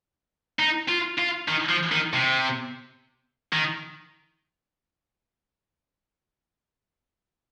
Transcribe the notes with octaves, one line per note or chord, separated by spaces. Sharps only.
D#4
F4
F4
D#3
F3
D#3
C3
D#3